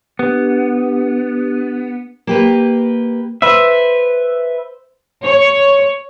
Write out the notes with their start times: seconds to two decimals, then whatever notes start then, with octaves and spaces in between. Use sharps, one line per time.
0.19 B3 D4 G4
2.27 A#3 G4 B4
3.42 B4 C5 E5
5.24 C#5